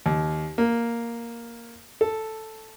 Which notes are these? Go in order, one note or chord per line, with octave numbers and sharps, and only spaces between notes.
D#2
A#3
A4